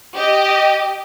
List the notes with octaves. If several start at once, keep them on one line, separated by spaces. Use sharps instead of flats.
G4 D#5